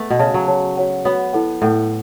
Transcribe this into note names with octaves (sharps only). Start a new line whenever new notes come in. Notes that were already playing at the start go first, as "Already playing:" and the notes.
Already playing: A3 B3
B2
C#3 F#4 C#5 A5
F#3
F#4 C#5 A5
F#4 C#5 F#5
B3 F#4 C#5 F#5
E4 A4 F#5
A2 E4 A4 F#5